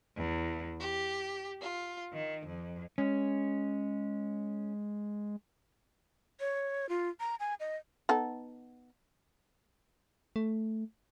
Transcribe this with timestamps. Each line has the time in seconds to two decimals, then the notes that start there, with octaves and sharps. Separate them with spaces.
0.17 E2
0.81 G4
1.61 F4
2.12 D#3
2.45 F2
2.98 G#3 C#4
6.40 C#5
6.89 F4
7.20 A#5
7.40 G#5
7.60 D#5
8.09 B3 D#4 A4
10.36 A3